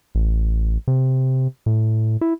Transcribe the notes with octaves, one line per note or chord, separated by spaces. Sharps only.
A1
C3
A2
E4